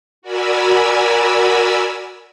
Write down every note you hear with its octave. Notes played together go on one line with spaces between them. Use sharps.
F#4 A#4 D5 G#5 B5 E6